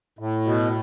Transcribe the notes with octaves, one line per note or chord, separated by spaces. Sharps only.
A2
B2